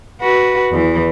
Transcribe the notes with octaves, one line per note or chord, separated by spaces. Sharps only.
F#4 B4
E2 E3